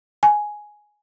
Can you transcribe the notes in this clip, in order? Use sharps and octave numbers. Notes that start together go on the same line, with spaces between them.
G#5